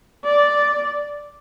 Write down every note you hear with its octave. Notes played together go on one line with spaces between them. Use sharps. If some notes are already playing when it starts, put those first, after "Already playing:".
D5